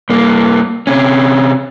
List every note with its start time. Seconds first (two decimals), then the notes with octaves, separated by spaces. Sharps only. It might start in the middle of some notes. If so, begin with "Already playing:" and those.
0.10 G2 A#3
0.87 C3 C#4